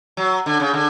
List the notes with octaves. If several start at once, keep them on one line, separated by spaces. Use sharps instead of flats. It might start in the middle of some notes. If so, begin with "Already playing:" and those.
F#3
D3
C#3
D3